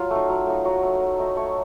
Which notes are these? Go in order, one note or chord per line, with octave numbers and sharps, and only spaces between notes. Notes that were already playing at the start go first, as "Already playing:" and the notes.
Already playing: F#3 F4
A3 D#4
F#3
A3 D#4
F#3 F#4
A3 D#4
F#3
A3 D#4
A3 C#5